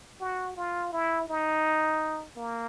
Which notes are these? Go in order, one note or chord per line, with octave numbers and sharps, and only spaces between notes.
F#4
F4
E4
D#4
A#3